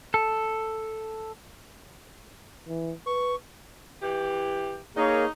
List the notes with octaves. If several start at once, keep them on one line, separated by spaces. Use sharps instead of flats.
A4
E3
B4 C#6
E3 G4
A#3 D#4 G#4 A#4 C#5